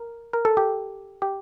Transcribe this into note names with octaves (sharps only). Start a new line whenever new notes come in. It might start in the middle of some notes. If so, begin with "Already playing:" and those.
Already playing: A#4
A#4
A4
G4
G4